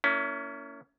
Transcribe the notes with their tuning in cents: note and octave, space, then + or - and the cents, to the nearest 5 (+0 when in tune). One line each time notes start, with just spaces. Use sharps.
A#3 -25 C#4 +25 E4 +0